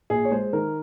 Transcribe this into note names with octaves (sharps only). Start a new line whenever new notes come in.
A#1 G#4
C#5
G#3 C5
D#3 A#4